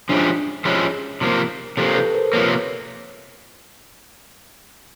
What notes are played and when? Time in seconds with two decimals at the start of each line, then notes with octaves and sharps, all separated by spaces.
0.09 F3 G#3 C#4 D4 E4 G4
0.65 F3 G#3 C#4 E4 G4 G#4
1.21 C3 F3 A#3
1.77 C3 F3 A#3 G4 A4
1.95 A4 B4
2.14 A#4 C5
2.33 C3 F3 A#3 B4 C#5